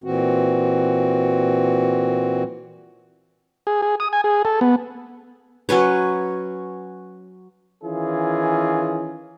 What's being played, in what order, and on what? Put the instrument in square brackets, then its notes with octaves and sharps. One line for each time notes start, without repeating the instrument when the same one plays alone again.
[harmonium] A#2 E3 C4 F#4
[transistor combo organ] G#4
G#4
D#6
G#5
G#4
A4
B3
[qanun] F#3 C#4 B4 C#5
[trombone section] D#3 E3 C#4 E4 F4 G#4